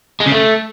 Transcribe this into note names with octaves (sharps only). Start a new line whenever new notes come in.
G#3
C#3
A3